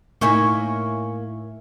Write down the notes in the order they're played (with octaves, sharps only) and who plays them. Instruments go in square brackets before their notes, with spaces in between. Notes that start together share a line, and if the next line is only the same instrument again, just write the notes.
[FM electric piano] A2 E5 [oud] A#3 D#4 E4 [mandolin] C#5 G#5 C#6